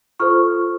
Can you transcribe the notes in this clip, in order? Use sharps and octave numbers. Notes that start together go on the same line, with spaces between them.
F4 A4 C5 C#6 F6